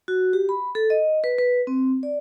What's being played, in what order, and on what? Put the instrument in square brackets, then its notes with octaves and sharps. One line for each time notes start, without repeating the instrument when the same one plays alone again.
[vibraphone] F#4
G4
B5
A4
D#5
B4
B4
C4
D5